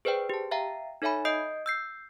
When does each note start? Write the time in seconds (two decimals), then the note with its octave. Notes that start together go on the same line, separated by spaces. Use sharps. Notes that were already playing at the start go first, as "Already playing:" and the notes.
0.05 G#4 B4 C5 D5 G5
0.29 G4 A5
0.51 E5 F5 G5 A#5
1.02 D#4 A4 C#5 E5 G#5 B5
1.25 D#5 D#6 G6 C7 D7
1.66 E6 G6 C7